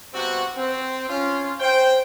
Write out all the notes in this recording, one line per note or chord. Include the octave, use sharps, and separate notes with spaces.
G2 C3 B3 C4 F#4
C4
C#4 F4
C5 G5